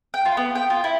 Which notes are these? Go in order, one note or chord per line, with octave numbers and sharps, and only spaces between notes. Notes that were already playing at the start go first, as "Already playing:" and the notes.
G5
F4
B3
G5
F4
E4